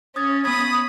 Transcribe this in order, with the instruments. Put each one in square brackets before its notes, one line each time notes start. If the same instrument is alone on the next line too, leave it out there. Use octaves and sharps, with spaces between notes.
[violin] C#4 C#5 [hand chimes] D#6 G#6 A6
[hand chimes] B3 G#6 [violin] B5 D#6